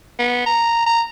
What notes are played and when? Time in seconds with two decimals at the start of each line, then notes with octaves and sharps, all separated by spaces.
0.19 B3
0.46 A#5
0.86 A#5